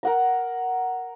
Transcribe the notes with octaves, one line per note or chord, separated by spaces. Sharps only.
A#4 F#5 A#5